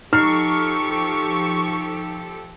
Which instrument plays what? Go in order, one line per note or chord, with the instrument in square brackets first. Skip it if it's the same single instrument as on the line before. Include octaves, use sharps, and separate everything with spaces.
[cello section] F3 G4 A4 [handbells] D#4 C7 [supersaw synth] C#6 [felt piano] F6